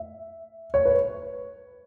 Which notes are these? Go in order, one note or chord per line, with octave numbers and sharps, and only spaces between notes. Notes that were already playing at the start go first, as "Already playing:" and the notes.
Already playing: E5
C#5
B4